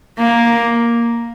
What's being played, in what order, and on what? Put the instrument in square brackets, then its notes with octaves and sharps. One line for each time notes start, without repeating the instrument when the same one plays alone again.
[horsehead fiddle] A#3